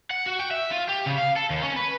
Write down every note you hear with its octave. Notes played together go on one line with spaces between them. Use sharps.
F#5
F#4
G5
E5
F4
G4
C#3
F5
A4
D#2
C#4
B4